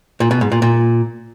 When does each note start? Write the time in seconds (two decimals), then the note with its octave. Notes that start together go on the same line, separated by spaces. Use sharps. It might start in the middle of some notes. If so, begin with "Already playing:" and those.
0.20 A#2
0.31 B2
0.41 G#2
0.52 A#2
0.62 A#2